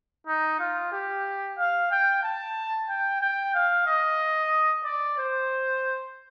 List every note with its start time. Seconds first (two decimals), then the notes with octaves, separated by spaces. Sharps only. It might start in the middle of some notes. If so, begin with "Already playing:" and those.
0.27 D#4
0.60 F4
0.92 G4
1.58 F5
1.91 G5
2.23 A5
2.89 G5
3.21 G5
3.54 F5
3.87 D#5
4.84 D5
5.18 C5